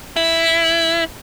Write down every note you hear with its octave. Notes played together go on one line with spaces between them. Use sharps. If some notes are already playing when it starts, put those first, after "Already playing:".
E4